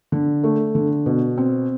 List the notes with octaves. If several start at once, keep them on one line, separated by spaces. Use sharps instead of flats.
D3
A3
D3
B2
C4